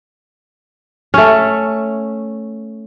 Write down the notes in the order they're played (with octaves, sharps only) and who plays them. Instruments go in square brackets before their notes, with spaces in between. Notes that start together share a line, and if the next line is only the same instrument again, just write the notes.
[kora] A3 C#4